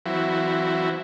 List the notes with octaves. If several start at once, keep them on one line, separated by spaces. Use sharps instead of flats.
E3 F#3 C4 E4 F#4